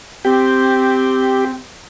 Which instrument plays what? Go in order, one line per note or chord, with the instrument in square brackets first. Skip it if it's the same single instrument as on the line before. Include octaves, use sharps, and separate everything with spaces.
[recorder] C4 [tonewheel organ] G4